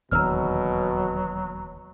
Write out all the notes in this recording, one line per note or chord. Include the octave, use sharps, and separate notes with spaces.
E1 D#2 B2 D3 F#3 A#5 E6 F6